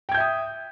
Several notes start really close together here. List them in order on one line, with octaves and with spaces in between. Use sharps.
G5 G#6 G6 E5 D#6